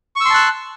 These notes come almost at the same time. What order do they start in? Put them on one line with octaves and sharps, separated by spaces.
C#6 E6 C6 A5 F#6